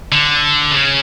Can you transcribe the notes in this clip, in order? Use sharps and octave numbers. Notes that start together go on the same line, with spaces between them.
D3
C#3